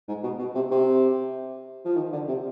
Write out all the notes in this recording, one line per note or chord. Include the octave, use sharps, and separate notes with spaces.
G#2
B2
B2
C3
C3
F3
D#3
D3
C3